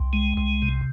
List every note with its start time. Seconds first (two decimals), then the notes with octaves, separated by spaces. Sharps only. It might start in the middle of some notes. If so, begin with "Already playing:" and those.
Already playing: C2
0.13 G#3
0.37 C2
0.62 C3